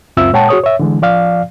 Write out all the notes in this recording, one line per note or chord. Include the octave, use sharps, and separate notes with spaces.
C#2 F#2 C4 F4 E5 E6
A#2 G#3 C#5 F#5 G5 A5
F#4 G#4 C#5 D#6
C#5 E5
D3 E3 G#3
F3 D5 F5